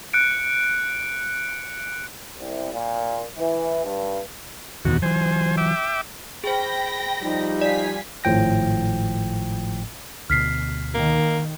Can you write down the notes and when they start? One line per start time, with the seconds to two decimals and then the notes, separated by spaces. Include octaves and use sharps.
0.14 F#6 C#7 D7
2.37 C2
2.73 A#2
3.37 E3
3.85 G2
4.85 A1 E2 B2 D#3 F#4
5.02 E3 F#3 C5 G#5
5.57 E5 G5 D6
6.44 G#4 C5 G5 B5 A#6
7.22 F3 G3 D#4
7.61 D5 F5 G#5 B6
8.24 G#1 A2 F3 G5 A#6
10.30 D2 B2 F6 B6 C7
10.94 D#3 A#3